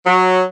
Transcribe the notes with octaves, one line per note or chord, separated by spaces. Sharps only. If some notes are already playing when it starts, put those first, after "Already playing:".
F#3